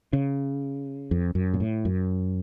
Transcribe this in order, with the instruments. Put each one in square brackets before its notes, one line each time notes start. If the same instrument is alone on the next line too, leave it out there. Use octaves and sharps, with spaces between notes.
[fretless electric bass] C#3
F2
F#2
A#2
A2
F#2